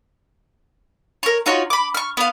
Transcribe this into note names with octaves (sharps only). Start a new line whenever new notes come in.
A#4 C#5
D#4 F4 F#4 C#5
B5 D6
C#6 F6
B3 F5